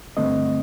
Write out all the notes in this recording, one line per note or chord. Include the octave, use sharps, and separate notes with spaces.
G2 D3 A3 C4 D#5